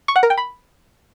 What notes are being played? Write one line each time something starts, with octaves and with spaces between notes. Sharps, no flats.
C#6
F#5
A#4
G5
B5